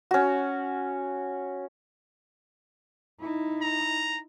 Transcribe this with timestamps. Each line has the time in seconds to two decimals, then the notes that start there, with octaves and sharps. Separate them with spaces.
0.11 C#4 F#4
3.20 D#4 E4
3.61 A#5